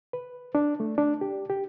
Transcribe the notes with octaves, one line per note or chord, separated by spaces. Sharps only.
B4
D4
A3
D4
G4
G4